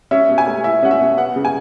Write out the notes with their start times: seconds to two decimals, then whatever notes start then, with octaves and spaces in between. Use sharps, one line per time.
0.11 C#4 E5
0.28 B2
0.38 G#5
0.47 A3
0.64 E4 E5
0.83 C#4 F#5
0.91 E5
1.00 B2
1.17 B3 F#5
1.36 C#3
1.45 G#5